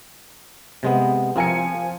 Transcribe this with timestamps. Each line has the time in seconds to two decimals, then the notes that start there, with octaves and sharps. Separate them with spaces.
0.83 C3 G#3 B3
1.36 F3 C4 A#4 G#5 C#7